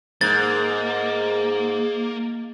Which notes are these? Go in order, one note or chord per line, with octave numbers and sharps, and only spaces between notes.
G#2 A#3 A6